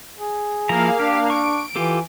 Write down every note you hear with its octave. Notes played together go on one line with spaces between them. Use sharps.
G#4
F3 A#3 E4 F5 A#5
D4 G4
C#6 D7
E3 F4 G4 A4